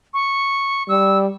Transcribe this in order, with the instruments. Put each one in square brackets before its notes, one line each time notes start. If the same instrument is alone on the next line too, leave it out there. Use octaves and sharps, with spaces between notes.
[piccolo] C#6
[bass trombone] G3 [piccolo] E6